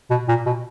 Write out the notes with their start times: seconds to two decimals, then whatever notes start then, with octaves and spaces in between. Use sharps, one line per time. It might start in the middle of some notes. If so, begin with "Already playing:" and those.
0.10 B2
0.28 A#2
0.46 B2